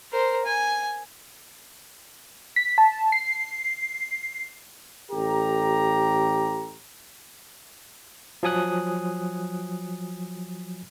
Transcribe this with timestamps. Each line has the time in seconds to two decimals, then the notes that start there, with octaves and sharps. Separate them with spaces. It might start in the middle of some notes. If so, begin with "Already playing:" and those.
0.12 A#4 C5
0.46 G#5
2.56 B6
2.78 A5
3.12 C7
5.11 A1 G4 A4 A#5
8.43 F3 F#3 G#5 D#6 F#6